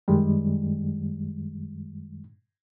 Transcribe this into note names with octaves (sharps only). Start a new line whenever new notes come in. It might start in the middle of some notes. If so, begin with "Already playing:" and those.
F#2 D#3 G3 G#3